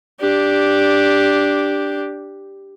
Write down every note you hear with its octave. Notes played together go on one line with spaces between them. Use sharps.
D4 G4